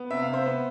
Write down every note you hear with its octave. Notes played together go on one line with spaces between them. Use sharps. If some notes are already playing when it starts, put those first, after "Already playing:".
Already playing: B3
C3 E5
F5
C3 C5 E5
B3